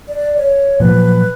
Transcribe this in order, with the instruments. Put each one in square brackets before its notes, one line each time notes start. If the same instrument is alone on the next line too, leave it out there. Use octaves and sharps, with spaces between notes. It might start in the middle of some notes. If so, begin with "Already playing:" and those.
[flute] D5
C#5
[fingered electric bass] A#2 F3 F#3 [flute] B4